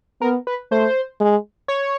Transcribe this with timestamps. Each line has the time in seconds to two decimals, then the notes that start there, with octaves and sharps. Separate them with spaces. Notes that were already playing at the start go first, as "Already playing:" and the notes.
0.21 B3 A#4
0.47 B4
0.71 A3 C5
1.21 G#3
1.68 C#5